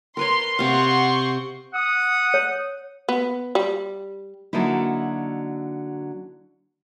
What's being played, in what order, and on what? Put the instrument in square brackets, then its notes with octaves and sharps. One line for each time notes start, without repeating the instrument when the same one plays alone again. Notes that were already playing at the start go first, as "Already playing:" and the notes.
[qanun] A#4 B4 C#5 [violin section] C6
[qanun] C3 F5 [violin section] F#5 C6 C#6
[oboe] F#5 [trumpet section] D#6
[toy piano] C#5
[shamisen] B3
G3
[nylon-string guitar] D3 F#3 A#3 D#4 E4